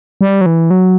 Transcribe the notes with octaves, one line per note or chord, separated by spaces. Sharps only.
G3
F#3
E3
F#3